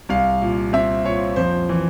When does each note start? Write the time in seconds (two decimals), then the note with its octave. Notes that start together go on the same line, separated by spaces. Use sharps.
0.09 C2 F5
0.42 A#2
0.73 C4 E5
1.05 A#2 C#5
1.36 F2 C5
1.69 E3